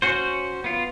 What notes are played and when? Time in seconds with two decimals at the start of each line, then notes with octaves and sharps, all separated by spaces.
0.02 C#4 F#4 C5
0.64 B3 F4